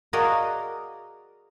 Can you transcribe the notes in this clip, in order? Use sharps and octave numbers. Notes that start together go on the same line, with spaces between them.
F#4 G#4 A#4 D5 D#5 F5